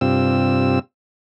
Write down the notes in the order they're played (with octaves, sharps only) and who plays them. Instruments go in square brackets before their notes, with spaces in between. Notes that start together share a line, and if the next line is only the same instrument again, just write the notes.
[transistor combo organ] G2 C3 C4 F4 E6